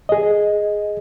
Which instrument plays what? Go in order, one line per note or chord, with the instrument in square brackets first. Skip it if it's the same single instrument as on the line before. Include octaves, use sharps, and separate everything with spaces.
[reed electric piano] G#4 D#5